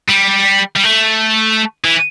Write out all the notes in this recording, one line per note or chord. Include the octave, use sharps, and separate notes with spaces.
G3
G3
A3
E3